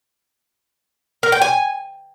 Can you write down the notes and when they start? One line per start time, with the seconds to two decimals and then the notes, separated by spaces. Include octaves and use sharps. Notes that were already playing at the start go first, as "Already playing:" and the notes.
1.23 A#4
1.32 G5
1.42 G#5